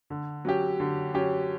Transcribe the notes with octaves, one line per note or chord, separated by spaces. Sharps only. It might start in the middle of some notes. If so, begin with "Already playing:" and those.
D3
F#3 C#4 G4
D3
F#3 C#4 G4